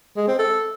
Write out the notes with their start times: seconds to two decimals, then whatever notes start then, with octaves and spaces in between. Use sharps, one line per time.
0.17 G#3
0.28 C4
0.39 A4